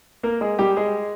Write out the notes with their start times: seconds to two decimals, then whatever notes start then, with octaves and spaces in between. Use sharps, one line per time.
0.23 A#3 A#4
0.41 G#3 G#4
0.59 G3 G4
0.77 G#3 G#4